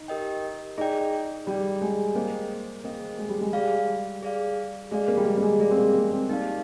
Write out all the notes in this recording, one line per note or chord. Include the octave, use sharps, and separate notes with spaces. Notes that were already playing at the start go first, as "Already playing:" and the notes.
Already playing: D#4
G4 A#4 D#5 G5
D#4 G#4 D5 G5
G3 G#4 D5 G5
G#3
A#3 G#4 C5 D#5 G5
A#3 G#4 C5 D#5 G5
G#3
G3
G#3
G3 G#4 D5 F5
G#4 D5 F5
G#3 G#4 D5 F5
A#3
G3
G#3
A#3
G#3
G#3 G#4 D5 F5
C4
A#3
A#3
C4
A#3 D#4 G4 D5 F5